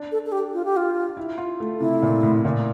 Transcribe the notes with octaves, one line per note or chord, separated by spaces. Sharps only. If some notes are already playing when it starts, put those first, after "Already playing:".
Already playing: D4
A4
A4
G4
F4
G4
F4
E4
F4
A3
C3 E4
A#2
A2
A#2